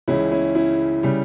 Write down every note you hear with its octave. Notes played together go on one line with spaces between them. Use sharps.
C#2 C#3 E3 C#4 E4
C#4 E4
C#4 E4
C#3 G3